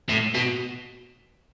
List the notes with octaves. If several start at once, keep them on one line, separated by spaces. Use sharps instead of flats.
A2
B2